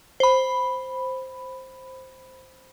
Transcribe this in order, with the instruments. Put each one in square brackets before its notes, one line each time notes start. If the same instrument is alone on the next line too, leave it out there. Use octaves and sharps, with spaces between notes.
[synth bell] C5 B5